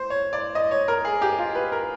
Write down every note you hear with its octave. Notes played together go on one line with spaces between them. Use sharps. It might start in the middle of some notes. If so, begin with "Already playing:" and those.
Already playing: C5
C#5
D5
D#5
C#5
A#4
G#4
G4
F4
B4
A#4